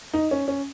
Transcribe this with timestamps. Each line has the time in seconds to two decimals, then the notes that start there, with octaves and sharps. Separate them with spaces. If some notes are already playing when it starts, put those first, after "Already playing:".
0.14 D#4
0.31 C#4
0.48 C#4